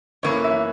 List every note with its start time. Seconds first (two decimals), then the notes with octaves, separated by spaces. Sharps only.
0.23 F#2 E3 A#3 C#5
0.44 E5